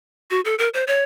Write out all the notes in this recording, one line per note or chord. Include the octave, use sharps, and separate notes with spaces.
F#4
A4
A#4
C5
C#5